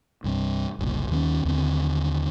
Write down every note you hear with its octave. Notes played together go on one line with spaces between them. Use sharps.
C2 G2 C3
F#1 C2 A#2
D#2 D#3 G#3 C#4
D#2 D3 C4